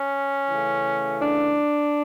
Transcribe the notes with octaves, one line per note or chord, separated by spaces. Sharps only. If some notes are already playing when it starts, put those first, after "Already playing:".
Already playing: C#4
C#3 E3 A3
D4